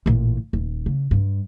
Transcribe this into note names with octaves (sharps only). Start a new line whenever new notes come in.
A1 A#2
D#1
C#3
G2